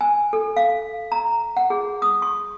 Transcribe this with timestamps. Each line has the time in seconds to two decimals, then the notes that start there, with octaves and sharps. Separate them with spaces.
0.01 G#5
0.33 A4
0.57 F5
1.12 A#5
1.57 F#5
1.70 G#4
2.02 D#6
2.22 C#6